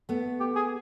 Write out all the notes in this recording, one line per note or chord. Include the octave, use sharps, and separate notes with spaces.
A3 B3
G4
G#4